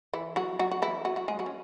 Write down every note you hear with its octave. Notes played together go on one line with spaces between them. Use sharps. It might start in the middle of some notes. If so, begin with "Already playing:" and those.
E3 E4
F#3 F#4
F#3 F#4
F#4
E3 E4
F#3 F#4
F#3 F#4
G#3 G#4
F#3 F#4
C#4